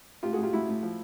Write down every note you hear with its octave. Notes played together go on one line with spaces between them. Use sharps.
A2 F4 G4
F#4 G#4
A2 F4 G4
A2 E4 F#4
A2
F3